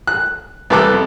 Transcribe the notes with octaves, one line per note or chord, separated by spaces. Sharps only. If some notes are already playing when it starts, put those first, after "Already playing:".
F#6
C2 E3 A4 D6 F#6
F2